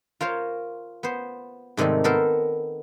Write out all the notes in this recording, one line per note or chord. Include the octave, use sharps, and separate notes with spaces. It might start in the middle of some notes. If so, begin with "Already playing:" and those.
F4 A#4 C5 C#5
B3 C5
G#2 C3 D#3 G3 A3
B3 A4 A#4 C5